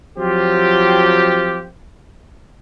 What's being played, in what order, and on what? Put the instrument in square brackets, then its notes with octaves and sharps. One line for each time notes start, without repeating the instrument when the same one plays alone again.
[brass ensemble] F3 F#3 C4 F4 G4